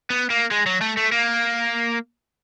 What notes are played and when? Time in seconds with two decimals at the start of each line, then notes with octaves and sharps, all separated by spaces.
0.10 B3
0.30 A#3
0.51 G#3
0.66 F#3
0.81 A3
0.97 A3
1.12 A#3